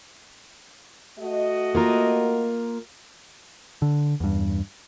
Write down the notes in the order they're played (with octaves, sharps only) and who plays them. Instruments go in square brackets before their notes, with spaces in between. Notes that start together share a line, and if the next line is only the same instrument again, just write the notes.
[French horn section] A3 F#4 D#5
[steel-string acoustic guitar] A#3 F4 A#4
[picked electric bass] D3
E2 G2